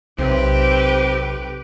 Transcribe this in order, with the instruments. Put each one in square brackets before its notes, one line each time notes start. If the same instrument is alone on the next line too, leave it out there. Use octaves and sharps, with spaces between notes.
[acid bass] B1 [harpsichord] C3 [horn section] C4 [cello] G4 B4